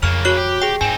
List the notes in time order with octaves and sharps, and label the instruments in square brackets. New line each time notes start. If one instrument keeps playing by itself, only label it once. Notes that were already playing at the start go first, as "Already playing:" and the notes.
[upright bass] F2 [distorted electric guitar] C#3 A#3 [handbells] F6
[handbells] F#4 C#5 F#6
[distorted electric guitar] G4
[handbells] G#4 G5
[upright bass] G#2 [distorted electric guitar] C4 D#4 [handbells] G#5